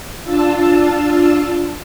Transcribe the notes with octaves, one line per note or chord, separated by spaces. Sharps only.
D4 F4 A5 E6